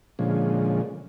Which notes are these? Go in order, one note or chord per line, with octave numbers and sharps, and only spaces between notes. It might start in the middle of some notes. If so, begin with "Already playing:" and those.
A#2 D3 F3 G#3 C#4